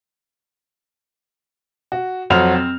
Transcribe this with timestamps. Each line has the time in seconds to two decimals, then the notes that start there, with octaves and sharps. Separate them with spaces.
1.92 F#4
2.30 F2 F#3 F#4 C5 F6 F7
2.54 C4